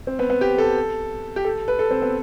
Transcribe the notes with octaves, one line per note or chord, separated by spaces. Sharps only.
C4
B3
B3
G4
A4
G4
A4
B4
A4
C4
B3